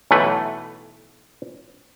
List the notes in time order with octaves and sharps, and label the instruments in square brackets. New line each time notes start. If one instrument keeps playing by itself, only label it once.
[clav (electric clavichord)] B1 E3 A3 B4